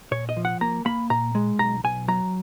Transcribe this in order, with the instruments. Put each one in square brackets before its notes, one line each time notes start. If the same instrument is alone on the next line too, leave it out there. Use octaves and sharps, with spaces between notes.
[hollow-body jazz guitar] A#2 C#5
D#5
F3
F#5
A#3 A#5
A#3 B5
A#2 A#5
G#3
B1 A#5
B1 G#5
F#3 A#5